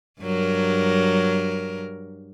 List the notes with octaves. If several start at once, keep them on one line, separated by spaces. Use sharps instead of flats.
G2 F#3 A#4